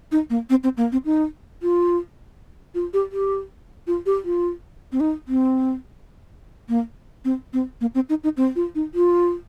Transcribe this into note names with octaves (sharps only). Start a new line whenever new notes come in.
D#4
A#3
C4
C4
A#3
C4
D#4
F4
F4
G4
G4
F4
G4
F4
C4
D#4
C4
A#3
C4
C4
A#3
C4
D#4
D#4
C4
F4
D#4
F4